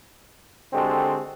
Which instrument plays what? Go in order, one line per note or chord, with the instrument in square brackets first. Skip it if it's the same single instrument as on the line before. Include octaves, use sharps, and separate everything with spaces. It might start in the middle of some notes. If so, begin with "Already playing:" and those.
[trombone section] D3 G#3 C4 F#4 G4 A4